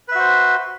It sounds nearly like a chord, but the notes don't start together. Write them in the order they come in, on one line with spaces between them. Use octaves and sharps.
B4 E5 F#4 C5